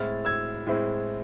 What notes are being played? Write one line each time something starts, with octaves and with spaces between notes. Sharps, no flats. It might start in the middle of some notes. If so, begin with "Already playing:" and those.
Already playing: A2 G#3 C4 E4 F6 A6
E6 G#6
A2 G#3 C4 E4